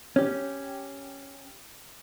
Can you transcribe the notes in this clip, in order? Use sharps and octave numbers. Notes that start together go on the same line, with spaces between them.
C#4 G4